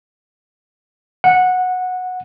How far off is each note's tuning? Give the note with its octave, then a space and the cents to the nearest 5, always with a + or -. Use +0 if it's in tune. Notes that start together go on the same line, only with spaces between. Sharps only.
F#5 -15